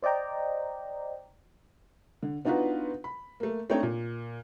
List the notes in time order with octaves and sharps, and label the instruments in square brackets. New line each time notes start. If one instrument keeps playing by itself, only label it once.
[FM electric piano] C5 D5 D#5 G5 A#5
[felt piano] D3
B3 D4 D#4 F4 F#4 B4
B5
A3 A#3
A3 C4 D4 D#4 C#5 G5
A#2